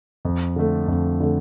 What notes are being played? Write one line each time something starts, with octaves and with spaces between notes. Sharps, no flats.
F2
D3 A3
F2
D3 A3